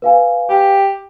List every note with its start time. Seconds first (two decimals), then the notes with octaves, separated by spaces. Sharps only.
0.02 B4 F5 G#5
0.50 G4